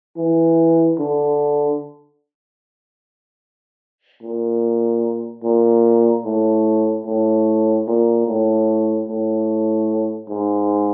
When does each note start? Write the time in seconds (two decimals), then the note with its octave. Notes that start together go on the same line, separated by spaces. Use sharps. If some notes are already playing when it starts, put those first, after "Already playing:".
0.17 E3
0.99 D3
4.23 A#2
5.44 A#2
6.25 A2
7.07 A2
7.87 A#2
8.28 A2
9.09 A2
10.30 G#2